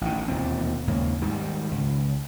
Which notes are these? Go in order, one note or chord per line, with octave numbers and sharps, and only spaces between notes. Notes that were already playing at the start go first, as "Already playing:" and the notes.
A1 D#3
E1 D#2 A#2 C4
D#2 G#2 C#3 A#3
G#2 D#3 G3
C#2